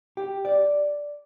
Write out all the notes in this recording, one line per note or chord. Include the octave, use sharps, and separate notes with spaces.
G4
D5